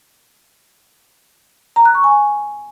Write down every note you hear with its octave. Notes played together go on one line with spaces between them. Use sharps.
A#5
F#6
C#6
G#5